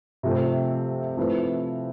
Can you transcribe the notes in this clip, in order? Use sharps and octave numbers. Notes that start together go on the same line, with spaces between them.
C3 F3 A3 C4
F3 A3 C4 E4 B4